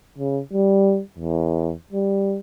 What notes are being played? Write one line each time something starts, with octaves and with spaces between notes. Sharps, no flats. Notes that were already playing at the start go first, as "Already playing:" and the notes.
C#3
G3
E2
G3